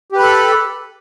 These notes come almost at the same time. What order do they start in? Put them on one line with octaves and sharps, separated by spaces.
G4 B4 B5 A4